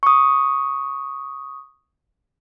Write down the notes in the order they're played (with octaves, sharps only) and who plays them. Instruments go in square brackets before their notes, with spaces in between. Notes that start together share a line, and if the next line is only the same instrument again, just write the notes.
[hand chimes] C#6 D#6